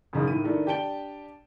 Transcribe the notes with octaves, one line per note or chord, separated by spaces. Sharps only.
F#2 C#3 D#4
A2 D#3 E4 D#7
D#3 A3 D4 E4
D4 G4 G5 A5 D7 G7